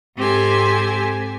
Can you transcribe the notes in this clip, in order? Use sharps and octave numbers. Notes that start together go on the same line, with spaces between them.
G#2 C4 G4 A4 C5 G#5